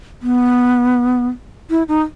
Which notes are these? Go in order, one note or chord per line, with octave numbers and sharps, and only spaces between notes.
B3
E4
D#4